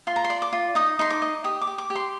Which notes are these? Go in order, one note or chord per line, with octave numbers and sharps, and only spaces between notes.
F4 C6
A#5
C6
D5
D6
F4
D#4 D#6
D#4 C6
D6
D#5
G4 D#6
D6
G4
D6
G4
C6